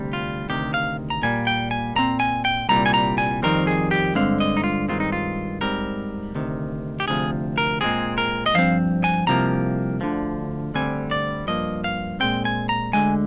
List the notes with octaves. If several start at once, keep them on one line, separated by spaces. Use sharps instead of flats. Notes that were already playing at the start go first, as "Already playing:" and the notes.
Already playing: D2 C3 G3
F4
D2 C3 D#3 G4
F5
A#5
A#2 G3 A#3 G#5
G5
G#5
A#2 F3 C4 A#5
G#5
G5
C2 A#2 G3 A#5
G#5
A#5
G#5
F2 D#3 G3 C4 A#4
G#4
G4
G2 D3 G#3 C4 F5
D#5
D#4
F4
G2 D#3 G#3 C4 F4
D#4
F4
G#2 G3 C4 A#4
D2 C3 D#3
G4
D2 C3 F3 G#4
A#4
A#2 G#3 C4 G#4
A#4
D#5
G2 F3 C4 F5
G#5
C2 C3 F3 A#3 A#5
D2 D3 F3
D2 D3 G3 C4 G#5
D5
G2 F3 A#3 D#5
F5
A#2 G#3 C4 G5
G#5
A#5
D2 D3 G#3 G#5